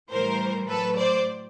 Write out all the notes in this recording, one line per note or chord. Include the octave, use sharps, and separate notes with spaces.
A2 E3 G3 A#4 C5
A2 F#3 A4 B4
C5 D5